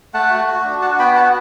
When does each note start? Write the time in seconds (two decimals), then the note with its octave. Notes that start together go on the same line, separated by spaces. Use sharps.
0.14 A3 F#5 A5
0.31 F#4
0.48 F#4
0.64 D4
0.81 F#4 F#5 A5
0.99 B3 G5 B5
1.15 F#4 F#5 A5